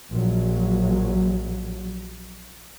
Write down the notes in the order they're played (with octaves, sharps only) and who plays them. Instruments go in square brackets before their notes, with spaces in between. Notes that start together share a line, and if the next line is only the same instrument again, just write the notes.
[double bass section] A#1 F#3